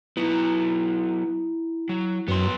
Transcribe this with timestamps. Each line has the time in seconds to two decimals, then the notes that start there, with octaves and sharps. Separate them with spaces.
0.17 F#3 B3 E4
1.89 F#3
2.28 F#2 B3 C6